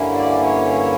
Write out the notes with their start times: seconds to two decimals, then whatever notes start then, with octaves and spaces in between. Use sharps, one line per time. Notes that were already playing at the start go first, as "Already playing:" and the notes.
Already playing: G2 D3 A#3 C#4 E4
0.14 D5
0.44 C#5